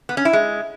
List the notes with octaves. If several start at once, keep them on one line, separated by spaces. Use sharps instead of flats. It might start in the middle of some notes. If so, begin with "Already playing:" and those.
B3
C#4
E4
G#3